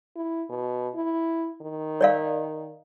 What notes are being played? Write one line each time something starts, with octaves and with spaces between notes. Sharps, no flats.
E4
B2
E4
D#3
C#5 D5 F5